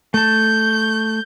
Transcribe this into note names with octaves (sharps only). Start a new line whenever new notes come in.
A3 A5 G6